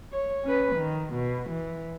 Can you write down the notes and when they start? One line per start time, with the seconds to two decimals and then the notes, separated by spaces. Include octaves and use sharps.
0.12 C#5
0.44 C#4 B4
0.75 D#3
1.13 B2
1.50 E3